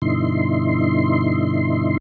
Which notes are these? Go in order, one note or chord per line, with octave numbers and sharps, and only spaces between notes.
G2 B2 D3 D#4 E4 C6